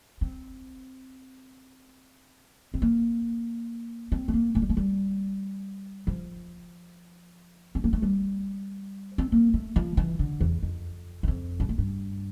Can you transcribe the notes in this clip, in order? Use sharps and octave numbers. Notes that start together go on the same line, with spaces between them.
C4
C4
A#3
C4
A3
A#3
A3
G3
A3
G3
F3
C4
A#3
A3
G3
C4
A#3
A3
F3
E3
D3
E2
F2
E2
F2
G2
A2
G2